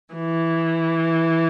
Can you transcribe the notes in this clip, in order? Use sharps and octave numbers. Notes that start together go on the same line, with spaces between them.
E3